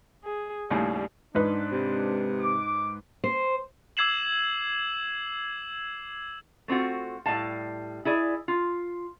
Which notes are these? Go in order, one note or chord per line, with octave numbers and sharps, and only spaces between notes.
G#4
D#2 A2 C#3 G3
G#2 D4 D#4 B4
C3
D6
C5
D6 E6 G#6 C7 E7 F#7
A3 C4 F4 F#4
A2 G3 F5 A5
E4 G#4 D5
F4